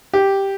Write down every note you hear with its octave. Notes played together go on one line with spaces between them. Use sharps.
G4